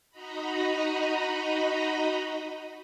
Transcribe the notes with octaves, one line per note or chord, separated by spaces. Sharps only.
D#4 F#4 D#5 A#5 B5